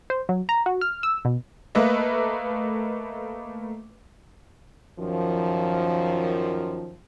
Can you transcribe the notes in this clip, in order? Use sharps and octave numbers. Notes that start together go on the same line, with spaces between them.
C5
F#3
A#5
F#4
F6
E6
B2
A3 A#3 B4 D#5 E5
F#2 D#3 F3